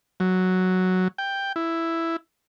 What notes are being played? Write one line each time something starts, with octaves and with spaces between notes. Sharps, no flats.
F#3
G5
E4